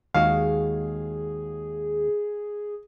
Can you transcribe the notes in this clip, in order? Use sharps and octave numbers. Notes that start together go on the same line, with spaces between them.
D#2 G#3 F#4 G#4 F5